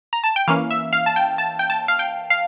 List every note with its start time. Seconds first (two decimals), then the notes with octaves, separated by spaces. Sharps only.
0.13 A#5
0.24 A5
0.36 G5
0.48 E3 A#3 C#4 F5
0.71 E5
0.93 F5
1.06 A5
1.16 G5
1.38 A5
1.59 G5
1.70 A5
1.88 F5
1.99 G5
2.30 F5